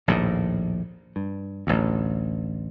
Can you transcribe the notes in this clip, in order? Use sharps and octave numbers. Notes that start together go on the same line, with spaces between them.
A#1 D#2 A2
G2
A1 D2